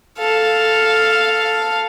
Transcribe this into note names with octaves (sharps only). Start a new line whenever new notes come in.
A4 F5